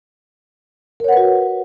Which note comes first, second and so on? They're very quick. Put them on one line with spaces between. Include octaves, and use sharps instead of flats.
A#4 C#5 F#5 B4 F#4